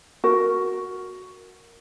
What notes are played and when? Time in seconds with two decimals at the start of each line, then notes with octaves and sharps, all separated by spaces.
0.24 F#4 A#4